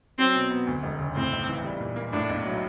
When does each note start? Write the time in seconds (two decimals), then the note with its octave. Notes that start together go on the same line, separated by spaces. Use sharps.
0.18 F#3 C4
0.35 B2
0.50 B3
0.67 D2
0.83 E1
0.99 C#3
1.16 A2 C4
1.32 B1
1.48 E3
1.64 G3
1.80 A#2
1.96 A#3
2.13 A2 D4
2.29 B1
2.45 F#3